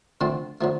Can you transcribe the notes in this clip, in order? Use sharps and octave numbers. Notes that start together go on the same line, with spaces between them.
D3 F3 A3 C4
D3 F3 A3